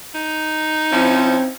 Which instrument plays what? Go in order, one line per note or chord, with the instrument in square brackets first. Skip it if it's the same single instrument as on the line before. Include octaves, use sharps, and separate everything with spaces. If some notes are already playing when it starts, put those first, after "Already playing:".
[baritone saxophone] D#4
[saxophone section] F3 C#4 E4 [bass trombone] C4